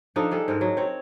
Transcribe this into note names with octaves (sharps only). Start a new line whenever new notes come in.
F3 D4 D#4 A4
G3 G#4 A4
G#2 G#3 A#4
F#3
C4 C#5